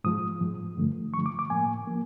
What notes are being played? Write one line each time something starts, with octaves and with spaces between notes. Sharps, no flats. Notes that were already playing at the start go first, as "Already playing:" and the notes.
G#2 F3 G#3 D#6
G#2 F3 G#3
G2 D3 F3 A3
G2 D3 F3 A3 C#6
D6
D6
A2 F3 A#3 G#5
F3 A#3